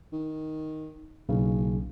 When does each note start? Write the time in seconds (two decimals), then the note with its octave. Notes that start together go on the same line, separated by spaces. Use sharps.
0.13 D#3
1.29 F#1 B1 C#3